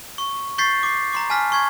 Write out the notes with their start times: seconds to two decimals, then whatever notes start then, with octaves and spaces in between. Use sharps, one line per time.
0.18 C#6
0.58 C#6 G6 A6 B6 C7
0.83 D6 C7
1.13 A#5 C6 D6
1.30 G#5 A5 F6 B6
1.52 C#6 G#6